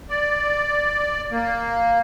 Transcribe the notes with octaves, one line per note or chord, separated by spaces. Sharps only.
D5
A#3